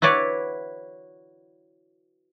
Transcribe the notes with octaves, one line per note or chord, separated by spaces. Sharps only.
E4 F#4 B4 C#5 D5